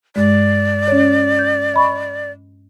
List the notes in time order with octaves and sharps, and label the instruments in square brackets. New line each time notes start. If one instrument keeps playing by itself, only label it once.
[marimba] G2 G#3 [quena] D5
[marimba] C#4 C#5
G6
D#5 B5 C#6